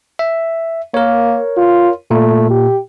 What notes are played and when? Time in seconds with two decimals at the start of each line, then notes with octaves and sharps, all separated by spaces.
0.19 E5
0.94 A#3 A#4 C#5
1.57 F4
2.11 A#2 A3
2.50 G4